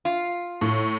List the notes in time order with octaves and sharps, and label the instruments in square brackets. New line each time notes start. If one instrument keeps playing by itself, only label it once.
[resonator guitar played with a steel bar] F4
[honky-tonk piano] A2